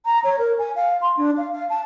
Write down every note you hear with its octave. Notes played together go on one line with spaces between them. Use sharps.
A#5
C#5
A#4
G#5
F5
C6
D4
F5
F5
A5